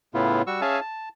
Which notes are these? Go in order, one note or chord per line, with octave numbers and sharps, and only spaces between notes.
A2 C#3 B3 E4 F4
G3 F#4 C#6 E6
C#4 G#4 E5 F5 G#5 A5
A5